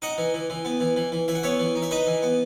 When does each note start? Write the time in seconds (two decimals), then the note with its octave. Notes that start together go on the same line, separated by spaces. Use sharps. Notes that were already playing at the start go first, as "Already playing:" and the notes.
0.02 D#4 D#5 F#5
0.18 E3
0.34 E3
0.50 E3
0.65 B3
0.80 E3
0.96 E3
1.12 E3
1.28 E3 E5
1.35 F#5
1.43 B3 C#5 E5
1.60 E3
1.76 D#4
1.82 E5
1.91 D#4 B4 D#5
2.07 E3
2.22 B3